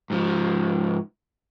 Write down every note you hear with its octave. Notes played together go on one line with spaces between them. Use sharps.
G#2 F3